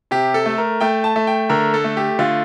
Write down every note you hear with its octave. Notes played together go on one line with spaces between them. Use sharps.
C3 G4
A4
A3
A#4
A3 G5
A5
A3
G5
D3 A#4
A4
A3
G4
D3 F4